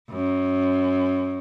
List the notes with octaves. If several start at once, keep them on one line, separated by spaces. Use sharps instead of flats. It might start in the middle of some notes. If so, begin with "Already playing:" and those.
F#2